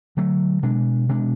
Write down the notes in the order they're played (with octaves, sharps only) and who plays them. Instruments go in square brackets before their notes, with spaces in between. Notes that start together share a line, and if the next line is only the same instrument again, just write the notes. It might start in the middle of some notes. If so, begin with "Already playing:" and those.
[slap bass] D3 F#3 A3
B2 G#3 D4
B2 G#3 D4